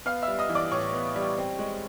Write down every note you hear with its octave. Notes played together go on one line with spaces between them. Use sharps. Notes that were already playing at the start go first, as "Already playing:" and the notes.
B3 F5 F6
E5 E6
G3
D#5 D#6
E3
D5 D6
A2 C#5 C#6
B3
G3
C4
G#3